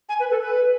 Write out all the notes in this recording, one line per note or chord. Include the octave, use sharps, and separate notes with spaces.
G#5
B4
A4
B4